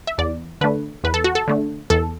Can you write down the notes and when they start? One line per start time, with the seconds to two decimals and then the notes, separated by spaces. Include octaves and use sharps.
0.07 E5
0.18 E2 D5
0.61 D3 A3 D4 B4
1.04 E2 B4
1.14 A4
1.24 F#4
1.35 A4
1.48 D3 A3 D4
1.90 E2 A4